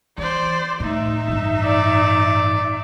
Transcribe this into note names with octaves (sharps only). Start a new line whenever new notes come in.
E3 C5 D5
A2 D#4 E5
A1 G2
D5